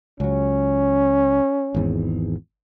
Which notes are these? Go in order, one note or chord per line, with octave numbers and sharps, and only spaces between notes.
C#2 F#3 C#4
G#1 E2 G#2